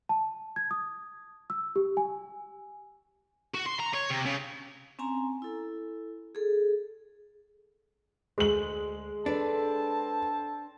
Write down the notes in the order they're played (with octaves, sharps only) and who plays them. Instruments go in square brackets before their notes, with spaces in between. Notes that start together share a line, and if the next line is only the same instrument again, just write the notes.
[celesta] A5
G#6
D#6
E6
G4
G#5
[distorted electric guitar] F#4
C6
A#5
C#5
C3
C#3
[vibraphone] C4 C#4 G#5 A#5
E4 A4
G#4 A4
[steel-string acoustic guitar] D2 [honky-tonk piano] G#3 F#7
[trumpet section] C4 A5 [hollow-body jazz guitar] D4 [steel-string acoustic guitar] A4 B4 D5